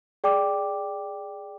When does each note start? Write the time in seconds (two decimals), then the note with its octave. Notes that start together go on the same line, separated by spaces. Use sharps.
0.24 G#4 D5 G5 D6